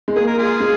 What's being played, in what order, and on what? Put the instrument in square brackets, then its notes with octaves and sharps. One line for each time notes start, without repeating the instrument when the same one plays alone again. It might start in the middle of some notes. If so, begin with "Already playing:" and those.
[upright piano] G#3
[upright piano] A#3 [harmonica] G#4
[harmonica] A#4
F4 G#4
[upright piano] G#3